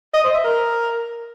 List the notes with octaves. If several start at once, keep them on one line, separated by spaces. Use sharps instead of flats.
D#5
C5
E5
A#4